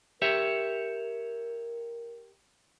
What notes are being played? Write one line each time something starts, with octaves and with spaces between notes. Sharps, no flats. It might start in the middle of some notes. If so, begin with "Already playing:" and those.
G4 A#4 C#5 E5